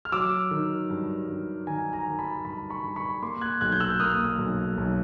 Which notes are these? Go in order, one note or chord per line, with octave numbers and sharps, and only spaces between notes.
F6
F#3 D6 E6
D#3
G2
G2
D#3 G#5 A#5
G#5 A#5
D#3
A5 B5
G2 A5 B5
B5 C#6
G2
B5 C#6
A#3 C6 D6
F#6 G#6
B1 F#6 G#6
G6
E6 F#6
A#3 D#6 F6
B1
B1